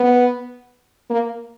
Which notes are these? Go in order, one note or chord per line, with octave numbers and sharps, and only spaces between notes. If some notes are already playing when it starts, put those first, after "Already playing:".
Already playing: B3
A#3